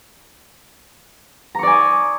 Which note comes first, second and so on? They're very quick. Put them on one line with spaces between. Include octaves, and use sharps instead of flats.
A#5 C#6 D5 G#5 D#6